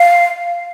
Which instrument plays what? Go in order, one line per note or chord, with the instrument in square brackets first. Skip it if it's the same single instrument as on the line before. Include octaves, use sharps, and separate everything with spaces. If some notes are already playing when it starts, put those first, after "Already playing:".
Already playing: [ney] F5